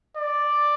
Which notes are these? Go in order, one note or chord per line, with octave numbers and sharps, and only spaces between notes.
D5